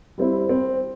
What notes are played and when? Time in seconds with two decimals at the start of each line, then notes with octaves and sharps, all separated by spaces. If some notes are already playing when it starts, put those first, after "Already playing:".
0.18 G3 C4 E4
0.49 C4